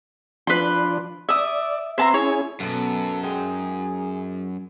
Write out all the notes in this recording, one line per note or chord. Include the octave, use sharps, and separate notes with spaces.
F3 D4 B4 C6
D5 E5 D#6
C4 B4 E5 A5 A#5 C6
C#4 E4 G#4 C#5
F#2 B2 B3 A4
G#3 D#4 G#4 G5